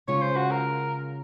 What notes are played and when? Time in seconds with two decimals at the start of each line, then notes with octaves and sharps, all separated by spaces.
0.08 C#3 G#3 C#4 F4 C#5
0.22 C5
0.37 F#4
0.51 A#4